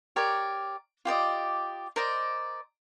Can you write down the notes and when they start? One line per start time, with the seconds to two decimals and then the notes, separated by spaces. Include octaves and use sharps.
0.16 G4 A#4 C#5 D5
1.05 F4 G4 D5 D#5
1.96 A#4 C5 D5 D#5